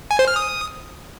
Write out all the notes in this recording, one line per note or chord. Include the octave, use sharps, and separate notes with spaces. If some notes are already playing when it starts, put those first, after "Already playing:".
G#5
C5
F6
D#6